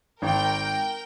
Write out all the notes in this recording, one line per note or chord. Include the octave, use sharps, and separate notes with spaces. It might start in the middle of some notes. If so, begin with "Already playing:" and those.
G#1 A#4 G5